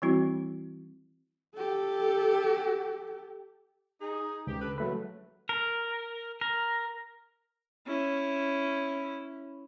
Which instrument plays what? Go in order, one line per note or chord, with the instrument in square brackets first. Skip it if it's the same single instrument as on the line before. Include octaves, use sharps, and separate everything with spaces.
[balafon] E3 G3 C4 E4 F#4
[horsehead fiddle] G4 A4
[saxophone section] D#4 G#4
[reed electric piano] C#2 [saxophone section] G4
[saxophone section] D4 A4 B4
[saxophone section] A2 C#3 E3 [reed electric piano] F#3 A3 B4
[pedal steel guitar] A#4
A#4
[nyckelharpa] C#4 E4